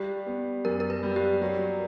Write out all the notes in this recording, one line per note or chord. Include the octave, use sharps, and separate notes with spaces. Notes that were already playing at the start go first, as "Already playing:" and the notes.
Already playing: G3 G4
B3
F#2 A#4
A#4
B4
G3
G4
F#3